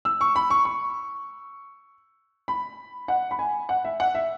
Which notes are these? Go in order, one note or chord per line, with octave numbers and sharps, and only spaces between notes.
E6
C#6
B5
C#6
C#6
B5
F#5
B5
G#5
F#5
E5
F#5
E5